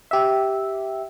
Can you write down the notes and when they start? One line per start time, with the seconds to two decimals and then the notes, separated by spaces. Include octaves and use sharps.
0.11 G4 E5